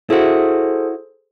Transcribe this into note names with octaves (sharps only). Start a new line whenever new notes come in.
E4 F#4 G#4 A4 C5